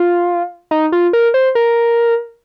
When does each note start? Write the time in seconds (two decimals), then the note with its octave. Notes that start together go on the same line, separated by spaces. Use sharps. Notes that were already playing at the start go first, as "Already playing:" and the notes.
Already playing: F4
0.71 D#4
0.92 F4
1.13 A#4
1.34 C5
1.55 A#4